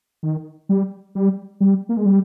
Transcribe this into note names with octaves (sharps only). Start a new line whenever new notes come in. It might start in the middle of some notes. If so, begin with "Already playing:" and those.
D#3
G3
G3
G3
A#3
G#3
G3